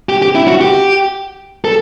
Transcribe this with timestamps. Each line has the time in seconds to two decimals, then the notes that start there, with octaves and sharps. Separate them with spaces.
0.09 G4
0.22 G4
0.35 E4
0.48 F#4
0.61 G4
1.65 A4